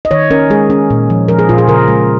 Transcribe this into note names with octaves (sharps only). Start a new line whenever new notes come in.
D#5
D#3 C#5
C#4 A#4
G#3 G#4
C#4
A#2
F3
F3 A#4
G#4
A#2 F4
G#4
C#3 A#4
G#3